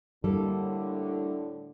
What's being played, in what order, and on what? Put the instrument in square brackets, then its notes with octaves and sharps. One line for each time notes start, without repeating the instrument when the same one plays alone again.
[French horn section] A2 D3 [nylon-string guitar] G3 A#3 A4